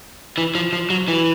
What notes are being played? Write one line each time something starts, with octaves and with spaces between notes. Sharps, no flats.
E3
F3
F3
F#3
E3